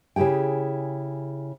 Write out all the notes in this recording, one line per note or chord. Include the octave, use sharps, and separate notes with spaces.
C#3 E4 G4 G#4 G5